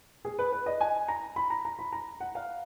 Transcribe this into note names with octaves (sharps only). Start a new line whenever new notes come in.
G#4
B4
B4
D#5
G#5
A#5
B5
A#5
A#5
B5
A#5
F#5
F5